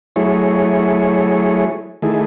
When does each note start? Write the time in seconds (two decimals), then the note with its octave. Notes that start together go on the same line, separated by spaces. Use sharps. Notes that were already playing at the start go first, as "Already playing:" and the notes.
0.16 F#3 A3 E4 G#4 C#5
2.02 D#3 A3 E4 G#4